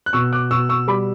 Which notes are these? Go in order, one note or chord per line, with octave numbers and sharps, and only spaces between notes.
F#6
B2 C#6 E6
D6 F#6
B2 C#6 E6
C#6 E6
G3 B5 D6